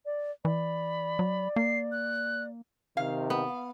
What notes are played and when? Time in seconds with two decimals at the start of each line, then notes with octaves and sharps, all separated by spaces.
0.06 D5
0.45 E3 D5 B5
1.19 F#3
1.56 A#3 C7
1.92 F#6
2.97 C3 D#3 F5
3.30 B3